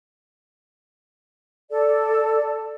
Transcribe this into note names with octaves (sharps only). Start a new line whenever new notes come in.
A4 D5